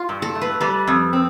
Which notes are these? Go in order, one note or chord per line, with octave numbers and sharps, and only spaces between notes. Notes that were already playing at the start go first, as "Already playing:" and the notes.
Already playing: F4
G2
A4
A3
B4
G3 B4
F2
C4